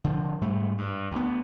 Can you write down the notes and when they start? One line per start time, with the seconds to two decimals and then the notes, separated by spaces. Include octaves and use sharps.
0.04 D3 F3
0.41 G#2 G3 A3
0.78 G2
1.12 D2 B3